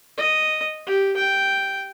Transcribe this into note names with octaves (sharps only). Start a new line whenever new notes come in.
D#5
G4
G5